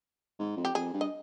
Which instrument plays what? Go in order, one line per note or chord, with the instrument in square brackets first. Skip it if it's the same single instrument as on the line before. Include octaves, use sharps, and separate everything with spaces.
[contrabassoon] G#2
F2
[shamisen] G4
[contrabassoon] F2 [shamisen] G#4
[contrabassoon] G2
[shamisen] D#5